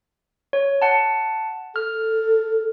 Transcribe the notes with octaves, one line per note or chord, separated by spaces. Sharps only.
C#5
F#5 A5
A4 F6